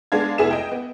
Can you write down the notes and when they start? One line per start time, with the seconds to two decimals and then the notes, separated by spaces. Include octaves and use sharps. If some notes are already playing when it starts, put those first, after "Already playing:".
0.12 G#3 B3 D4 F5 G#6
0.38 F1 B3 E4 G#4 E5 E7
0.51 D#5 G5
0.71 B3